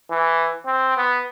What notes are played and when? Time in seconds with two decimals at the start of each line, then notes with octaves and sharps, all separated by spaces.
0.11 E3
0.66 C4
0.97 B3